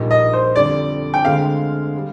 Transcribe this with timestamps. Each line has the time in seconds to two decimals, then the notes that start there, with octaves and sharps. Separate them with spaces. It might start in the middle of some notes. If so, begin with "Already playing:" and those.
Already playing: A#1 A#2 G3 A#3 D#4
0.11 D#5
0.33 C5
0.56 F2 D3 G3 D5
1.14 G5
1.25 D2 D3 G#3 C4 F5
1.97 G3